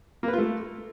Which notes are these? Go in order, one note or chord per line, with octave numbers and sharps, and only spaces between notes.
A#3
B4
F4
A3